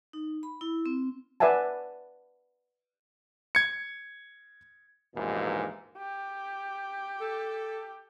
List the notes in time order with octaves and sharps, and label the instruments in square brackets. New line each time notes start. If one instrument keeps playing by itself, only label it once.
[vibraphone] D#4
B5
E4
C4
[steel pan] B4 D5 E5 F#5 G#5 A5
[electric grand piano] G#6 C#7
[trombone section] A#1 D#2 G#2 B2 E3 A#3
[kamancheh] G4
[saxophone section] A4